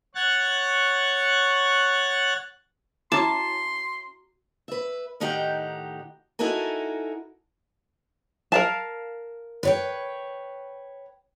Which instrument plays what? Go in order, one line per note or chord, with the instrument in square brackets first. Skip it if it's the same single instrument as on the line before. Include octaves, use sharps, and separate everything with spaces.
[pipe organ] C#5 F#5 C#6 F#6 A6
[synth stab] C#4 E4 [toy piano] F#4 A#5 D6 [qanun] A5 [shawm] C6
[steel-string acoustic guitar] B4 E5
A2 D#3 D#4 G4 F#5 G5
D#4 E4 F#4 A4 A#4 G#5
[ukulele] A#4 F5 A5
[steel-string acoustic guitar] B4 C#5 G5